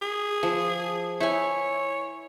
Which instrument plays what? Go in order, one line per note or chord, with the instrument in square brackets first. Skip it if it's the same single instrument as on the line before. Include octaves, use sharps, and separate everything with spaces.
[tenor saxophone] G#4
[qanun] F3
[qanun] E4 G#5 [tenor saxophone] C#5